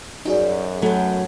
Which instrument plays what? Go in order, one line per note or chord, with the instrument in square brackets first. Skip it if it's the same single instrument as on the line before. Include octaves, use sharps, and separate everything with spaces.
[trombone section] F#2 [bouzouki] G3 [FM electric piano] D#4 F#4 G#4
[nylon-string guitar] F#3 A4 [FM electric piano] A3 [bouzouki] B3 G5